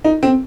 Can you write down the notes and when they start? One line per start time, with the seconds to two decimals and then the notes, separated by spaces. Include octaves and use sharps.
0.04 D#4
0.23 C4